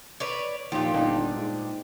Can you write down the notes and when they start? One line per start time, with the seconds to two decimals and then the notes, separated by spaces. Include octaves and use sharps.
0.20 B4 C#5 D5
0.72 D#2 A#2 F3 G4
0.94 G1 A#2 D4 D#4
1.36 G#2